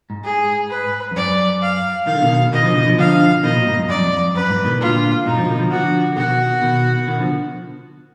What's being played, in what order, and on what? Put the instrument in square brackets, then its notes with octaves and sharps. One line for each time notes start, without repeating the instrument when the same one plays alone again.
[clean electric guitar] G#2
[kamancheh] G#4
B4
[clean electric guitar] F2
[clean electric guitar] F#2 [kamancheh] D5
[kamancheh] F5
[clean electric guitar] D#3 [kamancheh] F5
[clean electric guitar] D3
B2 D#3
[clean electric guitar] B2 D#3 [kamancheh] D#5
[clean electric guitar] D3 F3
B2 D#3
D3 F3
[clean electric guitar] D3 F3 [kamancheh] F5
[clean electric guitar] B2 D#3 [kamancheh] D#5
[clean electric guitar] A#2
G#2
F#2
[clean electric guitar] F#2 [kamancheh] D5
[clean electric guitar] F2
F2
[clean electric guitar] F#2 [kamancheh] B4
[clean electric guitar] G#2
B2 D#3
[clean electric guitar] A#2 D3 [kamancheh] F4
[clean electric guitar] G#2 B2 [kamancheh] D#4
[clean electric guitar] D3 F3
B2 D#3
D3 F3
[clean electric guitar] D3 F3 [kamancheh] F#4
[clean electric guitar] D3
[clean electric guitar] B2 D#3 [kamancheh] F#4
[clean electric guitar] B2 D#3
B2 D#3
D3 F3